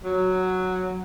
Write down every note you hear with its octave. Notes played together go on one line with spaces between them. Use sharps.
F#3